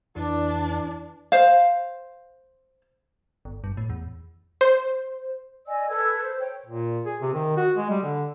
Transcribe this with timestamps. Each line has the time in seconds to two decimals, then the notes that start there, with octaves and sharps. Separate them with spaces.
0.16 F2 E3 D4 D5
1.32 C5 F5
3.45 G1
3.64 G2
3.77 A2
3.90 E2
4.61 C5
5.67 D5 D#5 G#5 E6
5.89 A4 B4 E6 G#6
6.22 C5
6.40 C#5 G5
6.66 A#2
7.05 G#4
7.21 C3
7.33 D#3
7.57 F#4
7.77 G#3
7.90 G3
8.03 D3